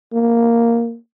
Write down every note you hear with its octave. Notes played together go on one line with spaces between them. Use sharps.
A#3